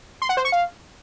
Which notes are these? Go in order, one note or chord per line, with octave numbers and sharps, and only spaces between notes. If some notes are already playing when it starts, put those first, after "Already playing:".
C6
F#5
C5
C#6
F5